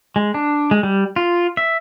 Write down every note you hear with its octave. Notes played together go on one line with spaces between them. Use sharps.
G#3
D4
G#3
G3
F4
E5